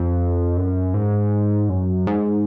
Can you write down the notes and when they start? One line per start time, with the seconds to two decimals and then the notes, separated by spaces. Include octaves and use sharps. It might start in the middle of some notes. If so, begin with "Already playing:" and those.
Already playing: F2
0.57 F#2
0.94 G#2
1.69 F#2
2.07 G#2